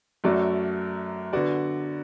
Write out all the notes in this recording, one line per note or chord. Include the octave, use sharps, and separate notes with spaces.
F#2 F#3 A3 F#4 D5
D3 B3 F#4 D5